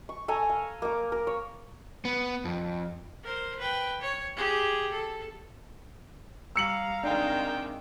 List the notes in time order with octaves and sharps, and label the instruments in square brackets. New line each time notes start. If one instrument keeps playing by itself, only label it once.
[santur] C#6
A4 C#5 G#5 A#5
F5
A#3 D6
A#4
C#5
[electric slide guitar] B3
F2
[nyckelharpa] A#4 C5
B4 G5
C#5
G4 G#4
A4
[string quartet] G3 [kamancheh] F5 A#5 [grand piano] E6 C#7 F#7
[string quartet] C3 D#3 G#3 [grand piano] D4 D#4 [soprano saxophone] G5